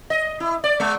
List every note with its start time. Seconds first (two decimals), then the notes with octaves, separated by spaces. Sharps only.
0.10 D#5
0.40 E4
0.64 D5
0.80 G#3